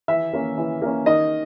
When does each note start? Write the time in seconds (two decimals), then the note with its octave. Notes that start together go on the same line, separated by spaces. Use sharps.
0.08 E3 E5
0.33 A#3 C#4
0.58 E3
0.82 A#3 C#4
1.06 D#3 D#5